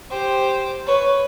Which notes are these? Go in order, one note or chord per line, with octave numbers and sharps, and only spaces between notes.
G4 C5
B4 C#5